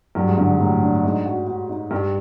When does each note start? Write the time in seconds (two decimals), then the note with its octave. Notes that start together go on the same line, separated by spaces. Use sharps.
0.15 G2 F#3
0.27 G#2
0.38 G2 D3
0.49 G#2
0.60 A2 F#3
0.82 D4
1.03 G#2 D#4
1.26 F#4
1.47 F#4
1.69 D#4
1.91 G2 G3